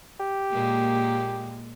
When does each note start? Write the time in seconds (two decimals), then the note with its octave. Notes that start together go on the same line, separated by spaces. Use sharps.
0.20 G4
0.52 A#2 G#3 A#3